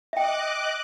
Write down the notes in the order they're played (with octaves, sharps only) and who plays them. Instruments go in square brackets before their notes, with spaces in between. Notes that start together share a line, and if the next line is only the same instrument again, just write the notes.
[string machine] D#5 D6 F#6 [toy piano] E5 G5